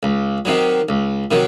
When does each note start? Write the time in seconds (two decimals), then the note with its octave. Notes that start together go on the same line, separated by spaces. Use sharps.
0.03 C#2
0.45 C3 D#3 F#3
0.89 C#2
1.31 C3 D#3 F#3